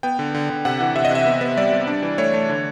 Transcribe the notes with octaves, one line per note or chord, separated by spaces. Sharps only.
B3 G5
D3
D3
D3
C3 F#5
E3
C3 E5
D#5
C3 E5
B3
B3
G3 D5
G3
D4
E3
A3 C#5
A3
D3